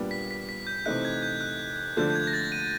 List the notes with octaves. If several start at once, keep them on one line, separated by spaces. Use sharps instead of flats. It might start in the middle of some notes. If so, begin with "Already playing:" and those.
Already playing: A#2 G3 B3 D4
B6
B6
B6
G6
C3 E3 A3 C4 D#4 F#6
G#6
G6
F#6
D3 F3 A3 D4 G6
G6
G#6
A#6
A6
D#7